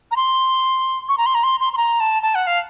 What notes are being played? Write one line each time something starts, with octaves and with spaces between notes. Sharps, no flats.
A#5
C6
C#6
A#5
C6
A#5
C6
C6
C6
A#5
A5
A5
F#5
F5